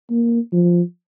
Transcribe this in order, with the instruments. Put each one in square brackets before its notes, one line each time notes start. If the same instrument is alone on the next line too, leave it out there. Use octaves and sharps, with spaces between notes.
[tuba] A#3
F3